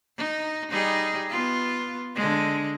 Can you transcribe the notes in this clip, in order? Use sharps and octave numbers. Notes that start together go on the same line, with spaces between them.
D#4
G3 D#4 G#4
B3 F4
D3 G#3